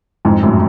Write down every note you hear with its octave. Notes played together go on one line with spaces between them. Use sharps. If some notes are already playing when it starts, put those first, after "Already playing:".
F2 G#2
F#2 A2